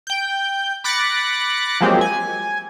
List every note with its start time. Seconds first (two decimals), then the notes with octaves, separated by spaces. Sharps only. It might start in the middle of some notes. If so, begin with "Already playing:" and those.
0.07 G5 G6
0.84 B5 D6 F#6 A6 A#6 C#7
1.81 F3 F#3 G#3 A#3 C4 G4
2.01 G#5